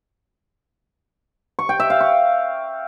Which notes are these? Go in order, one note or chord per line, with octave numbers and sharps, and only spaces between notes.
C#6
G5
E5
F5
C#6